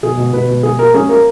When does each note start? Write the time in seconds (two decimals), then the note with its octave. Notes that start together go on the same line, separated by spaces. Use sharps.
0.03 B2 G#4
0.17 B2
0.32 B2 B4
0.48 B2
0.63 B2 G#4
0.79 A#3 A#4
0.94 C#4 G#4
1.09 A#3 A#4